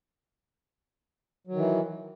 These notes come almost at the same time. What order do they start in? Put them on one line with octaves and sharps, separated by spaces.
F#3 D#3 E3